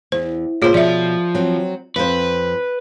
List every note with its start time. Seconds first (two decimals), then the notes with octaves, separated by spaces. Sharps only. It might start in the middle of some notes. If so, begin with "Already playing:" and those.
0.12 E2 C5
0.62 A#2 F4 G#4 C5 C#5
0.74 B2 F3 D5 E5
1.35 F#3 C4
1.96 F2 B4 C5